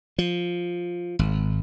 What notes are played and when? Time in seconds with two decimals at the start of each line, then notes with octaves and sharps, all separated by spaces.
0.18 F3
1.19 G#1